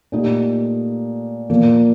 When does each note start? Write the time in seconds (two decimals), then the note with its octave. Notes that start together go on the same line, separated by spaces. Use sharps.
0.12 A#2 A3 D#4 G4
1.50 A#2 F3 A#3